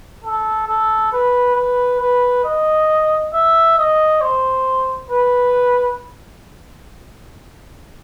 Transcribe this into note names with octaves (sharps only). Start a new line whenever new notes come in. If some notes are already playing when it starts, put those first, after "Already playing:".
A4
A4
B4
B4
B4
D#5
E5
D#5
C5
B4